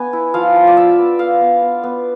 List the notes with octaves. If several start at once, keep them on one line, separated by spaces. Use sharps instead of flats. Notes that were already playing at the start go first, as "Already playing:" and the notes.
Already playing: B3 D4 G#5
E4
F3 F5
F3
D5
F4 E5
B3
B3 F5
B3
B3
B3